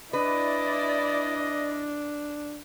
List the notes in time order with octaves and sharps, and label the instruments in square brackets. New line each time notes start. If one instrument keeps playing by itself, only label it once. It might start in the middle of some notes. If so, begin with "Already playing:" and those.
[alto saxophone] D4 [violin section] E4 D5 [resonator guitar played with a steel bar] B4 [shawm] D#5